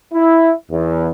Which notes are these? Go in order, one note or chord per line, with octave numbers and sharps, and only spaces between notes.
E4
E2